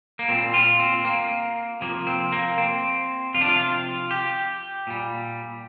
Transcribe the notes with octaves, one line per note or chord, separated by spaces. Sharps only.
A#3
A#2 G3 C4
F4
C4
A#3
C3 F3 A#3
C4
A#3
C4
C3 F3 F4
D4
F4
G4
A#2 G3